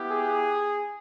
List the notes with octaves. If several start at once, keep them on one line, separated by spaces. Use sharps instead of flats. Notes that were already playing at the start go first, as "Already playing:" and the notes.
Already playing: B3 E4 G4
G#4